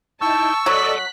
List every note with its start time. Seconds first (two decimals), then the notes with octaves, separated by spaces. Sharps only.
0.21 D#4 E4 G5 A5 C#6 E6
0.66 F#3 A4 D5 D#5 F#6 B6